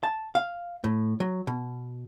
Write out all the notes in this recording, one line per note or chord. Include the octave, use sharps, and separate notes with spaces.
A5
F5
A2
F#3
B2